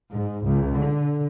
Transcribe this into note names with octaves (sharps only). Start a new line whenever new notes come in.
G#2
C#2
D3